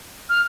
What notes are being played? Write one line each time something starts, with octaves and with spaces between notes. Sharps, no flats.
F6